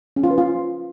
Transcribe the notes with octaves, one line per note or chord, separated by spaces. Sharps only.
C#4
F4
B4
F4